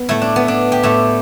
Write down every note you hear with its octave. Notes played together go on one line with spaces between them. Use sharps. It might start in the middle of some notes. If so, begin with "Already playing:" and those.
Already playing: B3
A2 A3 E4
D4
B3
D4
G4
A2 A3 E4